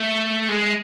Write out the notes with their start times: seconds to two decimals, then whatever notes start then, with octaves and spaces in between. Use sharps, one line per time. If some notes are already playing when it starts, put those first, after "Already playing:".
Already playing: A3
0.49 G#3